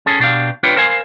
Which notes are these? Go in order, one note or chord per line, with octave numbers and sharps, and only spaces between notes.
C#4 G#4 A4
B2 D4 G4 F5
D4 F4 G4 B4 C#5
A#4 C5 F5 G#5